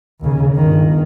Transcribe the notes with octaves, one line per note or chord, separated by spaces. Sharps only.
D#2 C#3
G1 D#3